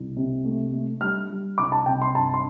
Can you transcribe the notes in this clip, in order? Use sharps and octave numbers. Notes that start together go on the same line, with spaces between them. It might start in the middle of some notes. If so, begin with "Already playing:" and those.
Already playing: C2
C3
A3
A3
G3 F6
G3
C2 D6
A5
C3 G5
C6
G2 A5
C6